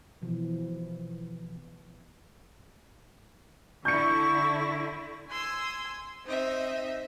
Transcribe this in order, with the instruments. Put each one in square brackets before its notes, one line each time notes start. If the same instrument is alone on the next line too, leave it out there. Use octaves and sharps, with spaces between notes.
[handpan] B2 E3 F3
[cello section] D3 E4 [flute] C#6 [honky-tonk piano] G6 C#7
[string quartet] G#5 C6 D#6 E6
C4 D#4 D#5 E5